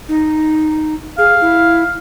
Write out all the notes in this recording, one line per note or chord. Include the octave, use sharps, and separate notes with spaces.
D#4
G#4 F5
E4